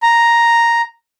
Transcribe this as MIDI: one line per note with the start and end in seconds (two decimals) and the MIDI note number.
0.02 0.81 82